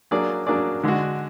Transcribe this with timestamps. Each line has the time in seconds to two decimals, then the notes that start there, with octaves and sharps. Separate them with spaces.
0.11 F#3 A#3 D4 G#4 D5
0.47 F#3 A#3 D4 G#4 D5
0.83 D3 G#3 D4 F#4